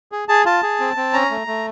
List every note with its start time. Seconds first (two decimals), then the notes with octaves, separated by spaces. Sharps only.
0.12 G#4
0.29 G#4 A5
0.45 F4 A5
0.63 G#4
0.80 C4
0.97 C4
1.13 C#4 A#5
1.30 A3
1.47 A3